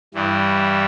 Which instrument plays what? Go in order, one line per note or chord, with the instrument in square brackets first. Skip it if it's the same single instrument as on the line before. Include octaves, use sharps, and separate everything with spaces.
[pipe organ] G2 E3 G3